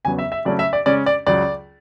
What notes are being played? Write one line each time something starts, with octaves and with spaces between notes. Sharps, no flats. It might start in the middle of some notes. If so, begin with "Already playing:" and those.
E2 C#3 F#3 B3 G#5
E5
E5
C#3 F#3 A3 C#4 D5
E5
D5
C#3 G#3 C#4 D5
D5
C#2 C#3 F#3 D5